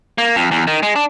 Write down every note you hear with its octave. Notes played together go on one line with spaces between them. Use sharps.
A#3
F2
E2
D#3
G#3
D4